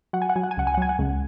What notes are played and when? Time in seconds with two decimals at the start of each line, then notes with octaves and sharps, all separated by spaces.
0.13 F#3 F#5
0.22 G#5
0.29 F#5
0.36 F#3 G#5
0.44 F#5
0.51 G#5
0.57 C#2 F#5
0.67 G#5
0.74 F#5
0.77 F#3 G#5
0.89 F#5
0.99 C#2